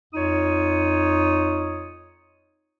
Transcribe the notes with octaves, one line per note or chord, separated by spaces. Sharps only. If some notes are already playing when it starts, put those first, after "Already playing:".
F2 D#4 F4 C#5 D#6